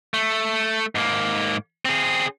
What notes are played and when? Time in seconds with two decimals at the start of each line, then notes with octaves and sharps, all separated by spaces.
0.14 A3
0.95 G#2 A#3
1.85 C4 G#4